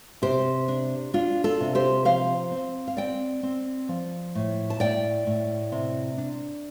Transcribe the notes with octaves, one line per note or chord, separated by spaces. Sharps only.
C3 G4 C5
D4
D4 F4
F4 A4
C3
G4 C5
F3 C5 F5
C4
F5
C4 D5 G5
C4
F3
A2
A5
A2 D5 G5
A2
C3
D4